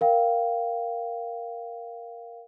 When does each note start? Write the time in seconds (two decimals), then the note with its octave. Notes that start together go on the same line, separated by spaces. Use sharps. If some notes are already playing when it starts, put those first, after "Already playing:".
0.01 A#4 F5 G5